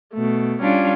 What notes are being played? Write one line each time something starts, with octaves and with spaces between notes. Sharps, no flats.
B2 A3
G3 C#4 D4 F4